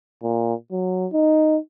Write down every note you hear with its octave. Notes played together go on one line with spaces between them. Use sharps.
A#2
F#3
D#4